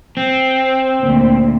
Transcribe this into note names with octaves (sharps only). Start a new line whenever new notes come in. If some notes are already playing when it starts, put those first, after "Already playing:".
C4
D2 A#2